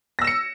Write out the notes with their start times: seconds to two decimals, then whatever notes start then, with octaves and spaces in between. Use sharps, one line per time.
0.19 A#6
0.22 E6
0.24 E7
0.27 C#7